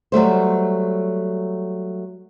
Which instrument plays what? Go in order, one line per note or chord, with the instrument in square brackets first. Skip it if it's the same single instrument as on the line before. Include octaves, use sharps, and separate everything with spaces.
[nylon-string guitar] F#3 G3 A3 C5